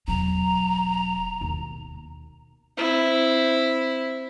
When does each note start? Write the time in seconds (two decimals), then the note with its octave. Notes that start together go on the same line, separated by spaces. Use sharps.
0.08 E1 F#3 A#5
1.41 D#2 B2
2.78 C4 E4